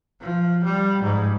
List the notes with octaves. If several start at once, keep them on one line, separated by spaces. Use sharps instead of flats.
F3
G3
G#2